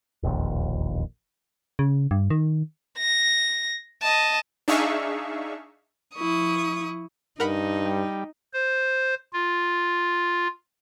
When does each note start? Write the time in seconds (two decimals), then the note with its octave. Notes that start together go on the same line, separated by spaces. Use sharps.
0.23 E1 A#1 D#2
1.79 C#3
2.11 G2
2.30 D#3
2.99 A#6
4.02 D#5 A5
4.68 D4 D#4 G#4 E5 F5 C#6
6.15 F3 E4 C#6 D#6
7.40 G2 D#4 A#4 F#5 B5
7.85 G3
8.53 C5
9.33 F4